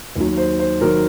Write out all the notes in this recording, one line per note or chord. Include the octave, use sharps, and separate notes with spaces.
D#2 D#3 F#3
C5
C5
D#3 F#3 A#4